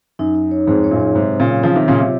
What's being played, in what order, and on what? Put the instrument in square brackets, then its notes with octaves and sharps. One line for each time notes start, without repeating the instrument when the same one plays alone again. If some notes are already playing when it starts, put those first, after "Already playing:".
[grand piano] F#2 [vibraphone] D#4
[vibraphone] D#4
C#5
[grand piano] F2 G#2 [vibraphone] G#4
[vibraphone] C#5
[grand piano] F#2 A#2
[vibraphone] C#5
[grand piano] G#2 C3 [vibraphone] F#3
[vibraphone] C4
[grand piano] A#2 C#3
[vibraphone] F#3
[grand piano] C#3 F3 [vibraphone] F4
[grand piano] C3 D#3 [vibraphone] F4
[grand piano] A#2 C#3
[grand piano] C3 [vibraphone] F4